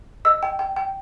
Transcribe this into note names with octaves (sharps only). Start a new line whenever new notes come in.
D#5 E6
G5
G5
G5